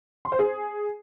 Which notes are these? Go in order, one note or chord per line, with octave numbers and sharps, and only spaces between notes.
C6
C5
G#4